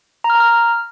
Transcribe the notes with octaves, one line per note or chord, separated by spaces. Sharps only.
A#5
F6
A#5
F6